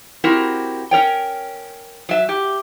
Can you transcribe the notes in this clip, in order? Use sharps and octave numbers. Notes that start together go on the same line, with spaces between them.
C4 E4 F#4 G4 A#4
C#4 A#4 C#5 G5
F#3 E5
G4